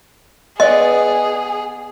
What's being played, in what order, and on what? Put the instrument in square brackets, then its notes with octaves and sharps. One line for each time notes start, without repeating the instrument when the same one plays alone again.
[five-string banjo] B3 D5 [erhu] G#4 [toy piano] D#5